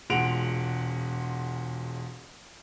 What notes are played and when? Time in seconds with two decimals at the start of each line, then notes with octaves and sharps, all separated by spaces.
0.10 E1 A#2 G#3 F#5 D7 F7